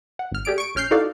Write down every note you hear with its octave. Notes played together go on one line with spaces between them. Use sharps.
F#5
G#1 F6
A3 G4 G#4 D5 D7
C#6 D7
A#1 C#4 F6 G6 C7
D#4 E4 F#4 A4 D5 F5